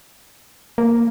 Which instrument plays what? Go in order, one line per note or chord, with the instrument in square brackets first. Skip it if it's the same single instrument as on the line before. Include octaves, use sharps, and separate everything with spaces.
[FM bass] A#3